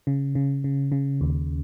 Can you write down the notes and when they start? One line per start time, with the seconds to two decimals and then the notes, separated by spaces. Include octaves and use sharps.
0.07 C#3
0.35 C#3
0.64 C#3
0.92 C#3
1.21 D#2